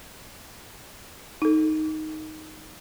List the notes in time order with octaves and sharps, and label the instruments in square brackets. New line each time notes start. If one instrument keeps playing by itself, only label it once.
[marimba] D#4 A4